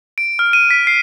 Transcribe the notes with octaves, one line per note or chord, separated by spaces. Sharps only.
D7
F6
D#7
B6
C7